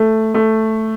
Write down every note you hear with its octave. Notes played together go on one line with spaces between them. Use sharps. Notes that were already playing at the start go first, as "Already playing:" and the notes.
Already playing: A3
A3